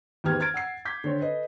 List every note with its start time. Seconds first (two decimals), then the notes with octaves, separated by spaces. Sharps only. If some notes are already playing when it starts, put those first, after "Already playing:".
0.24 E2 G#2 G4 B4 F6 G#6
0.40 F6 G#6 A6 D7
0.54 F#5 E6 C7
0.85 D6 G6 G#6 B6
1.04 D3 C4 C#5
1.20 A4 B4 D#5